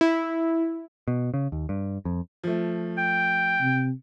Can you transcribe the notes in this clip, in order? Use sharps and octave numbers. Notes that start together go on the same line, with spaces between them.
E4
B2
C#3
D#2
G2
F2
F3 A3
G5
C3